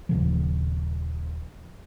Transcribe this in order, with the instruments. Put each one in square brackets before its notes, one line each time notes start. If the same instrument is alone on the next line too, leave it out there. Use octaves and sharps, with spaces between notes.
[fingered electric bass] D#1 C#3 F3